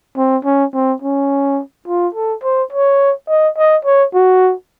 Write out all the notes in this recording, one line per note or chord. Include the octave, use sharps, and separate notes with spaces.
C4
C#4
C4
C#4
F4
A4
C5
C#5
D#5
D#5
C#5
F#4